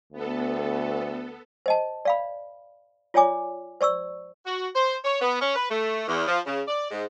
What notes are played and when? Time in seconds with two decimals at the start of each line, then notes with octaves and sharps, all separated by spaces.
0.13 D2 B3 A4
1.66 C5 D#5 A5
2.05 D5 F5 B5
3.14 F4 C#5 D5 G#5 D6
3.81 C5 D5 C#6 E6
4.47 F#4
4.76 C5
5.05 C#5
5.22 B3
5.42 C#4
5.56 B4
5.71 A3
6.08 E2
6.27 F3
6.46 C#3
6.68 D5
6.91 G#2